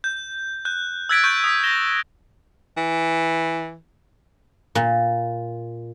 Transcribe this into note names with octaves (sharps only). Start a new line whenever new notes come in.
G6
F#6 G6
E6 F#6 G#6 A6 B6 D7
C#6 G6
D#6 B6
A#6 B6 E7 G7
E3
A#2